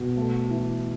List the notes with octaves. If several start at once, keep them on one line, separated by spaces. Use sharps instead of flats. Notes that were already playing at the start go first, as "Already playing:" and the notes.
Already playing: B2
A3
E3